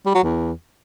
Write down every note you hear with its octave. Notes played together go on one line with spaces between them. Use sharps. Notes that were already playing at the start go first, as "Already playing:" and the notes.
G3
F#3
E2